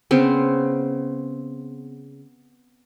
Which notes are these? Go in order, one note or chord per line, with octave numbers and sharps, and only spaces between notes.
C#3 B3 C4